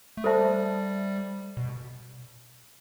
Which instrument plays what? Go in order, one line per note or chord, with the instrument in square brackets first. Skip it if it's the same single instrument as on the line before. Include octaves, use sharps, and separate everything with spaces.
[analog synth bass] A3
[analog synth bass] G3 [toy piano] A4 C5 E5 A5
[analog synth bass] B2